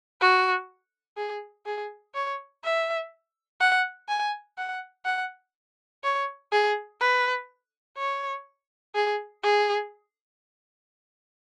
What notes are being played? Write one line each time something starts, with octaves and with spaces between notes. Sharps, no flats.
F#4
G#4
G#4
C#5
E5
F#5
G#5
F#5
F#5
C#5
G#4
B4
C#5
G#4
G#4